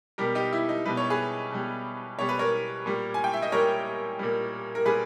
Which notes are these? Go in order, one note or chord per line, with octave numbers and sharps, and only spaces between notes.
B2 G3 G4 A#4
D#4 G4
E4
D#4
B2 G3 B4
C#5
G#4 B4
B2 G3
B2 G3 C#5
B4
A#4 C#5
A#2 G3
G#5
G5
E5
D#5
A#2 G3 A#4 C#5
A#2 G3
A#4
A#2 G3 G#4 B4